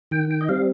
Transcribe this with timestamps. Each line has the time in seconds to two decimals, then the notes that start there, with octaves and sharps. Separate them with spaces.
0.11 D#3 G5
0.31 G5
0.41 D#5
0.49 G3 C4 F5